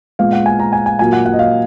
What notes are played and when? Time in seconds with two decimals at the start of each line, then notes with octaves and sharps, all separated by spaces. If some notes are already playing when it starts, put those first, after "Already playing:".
0.19 A#2 G#3 B3 F5
0.33 F#5
0.46 G#5
0.59 A#5
0.73 G#5
0.86 G#5
0.99 A#2 F#3 A#3 G#5
1.13 F#5
1.26 F#5
1.33 D#5
1.39 F5